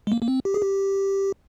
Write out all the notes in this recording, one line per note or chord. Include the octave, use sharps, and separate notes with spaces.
G#3
A#3
A#3
C4
G4
G#4
G4